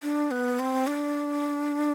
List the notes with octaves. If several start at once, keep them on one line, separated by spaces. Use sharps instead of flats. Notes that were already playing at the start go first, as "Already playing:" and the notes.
D4
B3
C4
D4